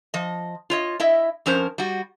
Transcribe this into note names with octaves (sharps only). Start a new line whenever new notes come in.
F3 D#5
F4 C#5 D#5
E4 D#5 E5
F2 F3 C#4 A#4 C5
G3 F#4